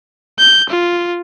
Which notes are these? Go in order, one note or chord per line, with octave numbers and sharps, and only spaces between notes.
G6
F4